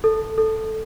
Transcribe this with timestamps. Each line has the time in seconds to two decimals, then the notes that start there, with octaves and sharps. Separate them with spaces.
0.04 A4
0.38 A4